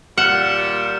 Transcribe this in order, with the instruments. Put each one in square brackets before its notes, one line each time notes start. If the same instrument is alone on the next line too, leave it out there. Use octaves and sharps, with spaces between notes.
[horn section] A#2 G3 [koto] F#5 [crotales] F6 C#7 E7